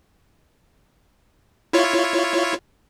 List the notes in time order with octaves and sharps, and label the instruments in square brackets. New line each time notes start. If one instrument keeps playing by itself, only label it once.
[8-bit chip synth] E4 F4 C#5